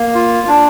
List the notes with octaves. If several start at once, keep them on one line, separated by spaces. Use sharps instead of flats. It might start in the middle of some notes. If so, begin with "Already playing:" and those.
Already playing: A#3
F4
D4